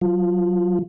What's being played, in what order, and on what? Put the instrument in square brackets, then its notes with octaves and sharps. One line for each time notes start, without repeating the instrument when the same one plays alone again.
[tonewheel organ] F#3 F4